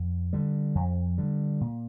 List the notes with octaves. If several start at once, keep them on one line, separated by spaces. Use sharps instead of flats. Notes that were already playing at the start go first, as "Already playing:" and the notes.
Already playing: F2
D3 G3
F2
D3 G3
A#2